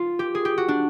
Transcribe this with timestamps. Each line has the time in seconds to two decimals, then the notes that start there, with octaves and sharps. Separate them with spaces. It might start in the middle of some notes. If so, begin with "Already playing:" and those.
Already playing: F4
0.19 G4
0.35 G#4
0.45 G4
0.58 F#4
0.68 D4